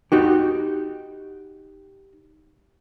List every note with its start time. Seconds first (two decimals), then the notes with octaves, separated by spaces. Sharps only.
0.12 D#4 F#4 G4